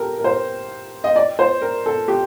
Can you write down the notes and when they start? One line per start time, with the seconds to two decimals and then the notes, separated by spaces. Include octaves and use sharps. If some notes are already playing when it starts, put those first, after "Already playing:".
Already playing: G4 A4 A#4
0.18 A#4
0.24 C5
1.04 D#5
1.16 D5
1.39 C5
1.62 A#4
1.86 A4
2.08 G4